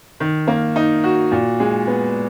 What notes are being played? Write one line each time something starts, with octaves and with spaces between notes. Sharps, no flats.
D#3
A#3
D#4
F#4
A#2
G#3
B3